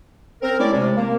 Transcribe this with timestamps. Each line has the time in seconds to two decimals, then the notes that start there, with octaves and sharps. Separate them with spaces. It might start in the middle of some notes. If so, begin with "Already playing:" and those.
0.42 C4 A#4
0.59 G#3 A3 C#4 E4 D5
0.72 C3
0.97 A3 A#3 C4